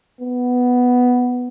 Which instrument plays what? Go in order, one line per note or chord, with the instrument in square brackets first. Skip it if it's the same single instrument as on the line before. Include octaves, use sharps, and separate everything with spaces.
[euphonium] B3